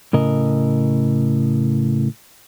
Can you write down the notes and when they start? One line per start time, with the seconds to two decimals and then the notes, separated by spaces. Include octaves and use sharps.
0.13 A2 C#3 A#4 D#5